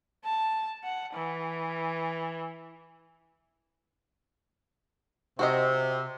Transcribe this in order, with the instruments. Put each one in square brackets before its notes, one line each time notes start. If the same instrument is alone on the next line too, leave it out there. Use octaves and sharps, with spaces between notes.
[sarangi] A5
F#5
E3
[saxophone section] C3 [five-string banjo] F#4 C5 D#5